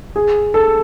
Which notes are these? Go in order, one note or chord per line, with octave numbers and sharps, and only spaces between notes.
G#4
A4